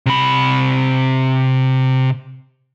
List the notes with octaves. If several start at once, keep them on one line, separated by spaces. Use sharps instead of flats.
C3 B5